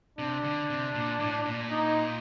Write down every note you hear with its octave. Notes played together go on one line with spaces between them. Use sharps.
C3 D4
D3
C3
A#2
A2
A#2
D#4